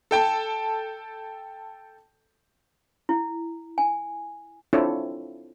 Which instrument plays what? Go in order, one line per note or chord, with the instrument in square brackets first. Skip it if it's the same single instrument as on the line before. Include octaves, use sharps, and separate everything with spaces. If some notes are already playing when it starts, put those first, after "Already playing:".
[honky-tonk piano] A4 G5 A5
[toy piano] E4
G#5
[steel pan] C4 D4 E4 F4 A4 C#5